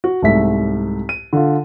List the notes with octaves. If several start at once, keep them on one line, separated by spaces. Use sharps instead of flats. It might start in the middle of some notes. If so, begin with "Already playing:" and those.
F#4
C2 G#2 A3 E5 B6
D#7
D3 F4